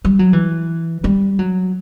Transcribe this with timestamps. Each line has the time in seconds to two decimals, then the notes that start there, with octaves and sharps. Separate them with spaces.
0.05 G3
0.19 F#3
0.33 E3
1.04 G3
1.39 F#3